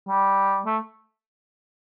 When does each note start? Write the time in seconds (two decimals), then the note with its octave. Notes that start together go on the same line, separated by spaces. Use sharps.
0.09 G3
0.66 A3